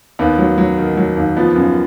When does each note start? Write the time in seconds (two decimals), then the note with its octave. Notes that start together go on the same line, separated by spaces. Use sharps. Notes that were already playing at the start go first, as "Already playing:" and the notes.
0.19 D#2 B3
0.38 F#3
0.58 F#3
0.78 D#3
0.97 F#3
1.17 D#2
1.37 F3 B3
1.56 F#2